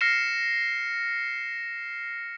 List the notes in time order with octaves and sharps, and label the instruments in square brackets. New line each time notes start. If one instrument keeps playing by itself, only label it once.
[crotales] F6 A#6 C7 C#7 E7